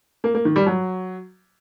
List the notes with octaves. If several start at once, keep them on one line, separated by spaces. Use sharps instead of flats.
A#3
A#3
D#3
G3
F#3